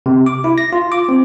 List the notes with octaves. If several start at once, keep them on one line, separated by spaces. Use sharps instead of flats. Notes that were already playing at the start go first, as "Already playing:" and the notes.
C3
D6
E4
A#6
F4
D6
C4